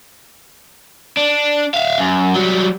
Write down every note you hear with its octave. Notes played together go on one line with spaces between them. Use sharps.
D4
E5 F5
F#2
F#3 G3